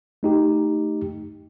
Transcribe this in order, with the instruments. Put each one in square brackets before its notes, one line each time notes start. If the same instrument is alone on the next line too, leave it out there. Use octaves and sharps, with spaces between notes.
[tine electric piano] A3 D#4 G4